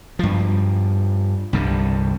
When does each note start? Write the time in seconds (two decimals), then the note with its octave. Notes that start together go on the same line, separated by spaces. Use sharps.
0.19 G2 F3
1.53 C2 G2 D3